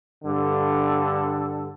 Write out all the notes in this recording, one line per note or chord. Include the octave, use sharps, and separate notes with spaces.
G2 D3 A4